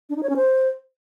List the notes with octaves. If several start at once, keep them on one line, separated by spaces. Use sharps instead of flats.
D4
D#4
C#5
C#4
C5